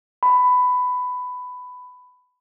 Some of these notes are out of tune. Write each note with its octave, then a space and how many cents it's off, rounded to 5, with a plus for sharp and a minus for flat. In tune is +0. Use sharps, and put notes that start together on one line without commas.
B5 +15